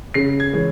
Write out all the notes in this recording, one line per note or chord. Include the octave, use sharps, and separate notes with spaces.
C#3 C7
G#6
E3 G#3 C#4